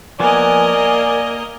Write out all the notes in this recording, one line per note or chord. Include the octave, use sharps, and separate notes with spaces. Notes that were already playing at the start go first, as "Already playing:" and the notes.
F3 A#3 B3 A#4 D5 D#5 G#5
A#3